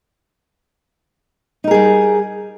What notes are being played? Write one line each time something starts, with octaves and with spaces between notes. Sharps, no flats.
G3 D#4 G#4 A#4